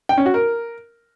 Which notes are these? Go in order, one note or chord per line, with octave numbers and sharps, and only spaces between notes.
G5
C#4
F#4
A#4